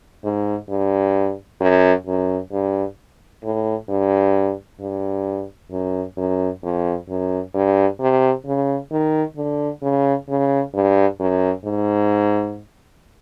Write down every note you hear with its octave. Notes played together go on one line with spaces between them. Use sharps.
G#2
G2
F#2
F#2
G2
A2
G2
G2
F#2
F#2
F2
F#2
G2
C3
C#3
D#3
D3
C#3
C#3
G2
F#2
G#2